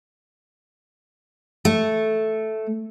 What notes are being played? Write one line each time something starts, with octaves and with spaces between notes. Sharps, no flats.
A3